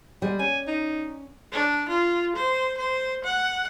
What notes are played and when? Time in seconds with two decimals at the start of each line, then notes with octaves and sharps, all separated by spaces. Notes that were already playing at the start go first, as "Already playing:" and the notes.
0.22 G3 G#3
0.39 C#4 G#5
0.67 D#4
1.52 D4
1.88 F4
2.36 C5
2.77 C5
3.24 F#5